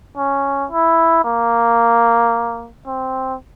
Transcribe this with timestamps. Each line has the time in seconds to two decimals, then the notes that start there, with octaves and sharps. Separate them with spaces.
0.17 C#4
0.71 E4
1.25 A#3
2.87 C4